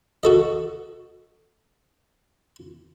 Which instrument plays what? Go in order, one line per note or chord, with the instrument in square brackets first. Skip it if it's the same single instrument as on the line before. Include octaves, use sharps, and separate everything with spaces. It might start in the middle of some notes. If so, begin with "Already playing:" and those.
[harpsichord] F#4 A4 D#5